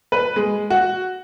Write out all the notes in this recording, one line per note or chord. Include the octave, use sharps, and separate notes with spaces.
B4
G#3
F#4